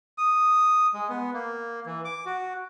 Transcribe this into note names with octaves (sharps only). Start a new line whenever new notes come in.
D#6
G#3
B3
A#3
E3
D6
F#4